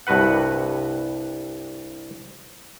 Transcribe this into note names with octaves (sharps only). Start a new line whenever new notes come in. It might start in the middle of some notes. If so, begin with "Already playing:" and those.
C2 G2 F#4 B4 F#5